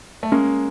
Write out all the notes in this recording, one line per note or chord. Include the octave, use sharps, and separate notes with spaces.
A3
G#3 A#3 C#4